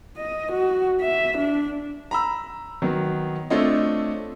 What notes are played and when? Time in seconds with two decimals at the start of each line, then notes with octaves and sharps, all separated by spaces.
0.17 D#5
0.52 F#4
1.01 E5
1.38 D4
2.11 A#5 B5 E6
2.82 D#3 F#3 B3
3.50 A3 C4 D4 F4 C#5 D#5